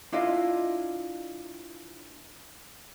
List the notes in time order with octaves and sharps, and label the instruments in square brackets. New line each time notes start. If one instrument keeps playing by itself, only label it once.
[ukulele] D4 E4 F4 D#5